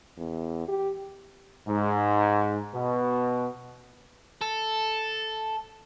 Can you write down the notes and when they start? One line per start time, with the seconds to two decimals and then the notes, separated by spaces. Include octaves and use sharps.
0.17 E2
0.68 G4
1.68 G#2
2.74 B2
4.41 A4